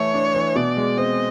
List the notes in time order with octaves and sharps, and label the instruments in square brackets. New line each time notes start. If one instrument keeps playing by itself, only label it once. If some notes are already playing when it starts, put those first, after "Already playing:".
Already playing: [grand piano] E3 A3 [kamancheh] C#5
[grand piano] D4
E3
[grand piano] B2 [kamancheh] D5
[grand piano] G#3
[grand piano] C4 [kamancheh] D#5